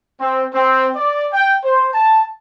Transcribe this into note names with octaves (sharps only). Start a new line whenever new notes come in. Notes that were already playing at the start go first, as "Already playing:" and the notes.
C4
C4
D5
G5
C5
A5